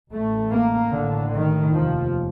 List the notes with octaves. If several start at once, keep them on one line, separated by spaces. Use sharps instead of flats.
A1 A2 A3
A#3
A1 A2 D3
D#3
F1 D#2 F3